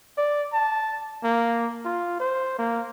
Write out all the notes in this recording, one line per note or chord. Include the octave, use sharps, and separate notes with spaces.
D5
A5
A#3
F4
C5
A#3